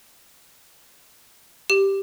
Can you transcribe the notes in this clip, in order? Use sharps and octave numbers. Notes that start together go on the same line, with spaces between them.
G4